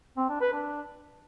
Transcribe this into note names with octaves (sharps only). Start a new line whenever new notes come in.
C4
D4
B4
D4